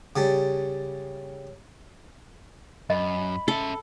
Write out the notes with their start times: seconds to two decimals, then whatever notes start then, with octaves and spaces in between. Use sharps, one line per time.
0.16 C#3 G3 A5
2.90 F#2 D#5 B5
3.48 C#4 A4 E5